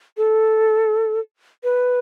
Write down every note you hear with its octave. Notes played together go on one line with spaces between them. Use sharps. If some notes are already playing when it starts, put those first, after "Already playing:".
A4
B4